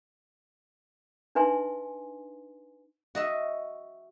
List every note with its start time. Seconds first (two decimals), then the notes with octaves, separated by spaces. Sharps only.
1.35 D4 D#4 B4 E5 G#5 C6
3.15 F#4 D#5 E5